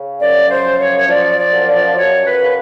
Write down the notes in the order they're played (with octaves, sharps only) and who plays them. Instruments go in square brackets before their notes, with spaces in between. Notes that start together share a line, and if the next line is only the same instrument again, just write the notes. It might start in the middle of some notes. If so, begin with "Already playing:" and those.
Already playing: [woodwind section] C#3
F#2 D5
C5
F3
C#5
C#5
F3 D5
D5
F#2
D5
F#2 C#5
B4
C#3